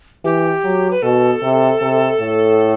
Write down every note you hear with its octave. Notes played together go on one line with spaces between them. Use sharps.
E3 G4
F#3
B4
B2 A4
C3
C3
A2